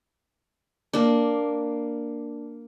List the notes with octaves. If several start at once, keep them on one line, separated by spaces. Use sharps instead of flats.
A#3 D4